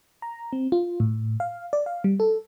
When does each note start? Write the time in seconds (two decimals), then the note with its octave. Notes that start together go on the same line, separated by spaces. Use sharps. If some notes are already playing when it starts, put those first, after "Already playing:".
0.22 A#5
0.53 C4
0.72 F4
1.00 A2
1.40 F5
1.73 D5
1.86 F5
2.04 G3
2.20 A4